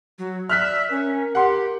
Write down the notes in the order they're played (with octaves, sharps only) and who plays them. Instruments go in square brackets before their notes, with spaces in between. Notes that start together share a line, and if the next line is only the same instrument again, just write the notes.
[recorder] F#3
[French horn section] D5 [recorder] E5 [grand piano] F6 F#6 B6
[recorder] C#4 [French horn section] A#4
[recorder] G4 [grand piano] F#5 C6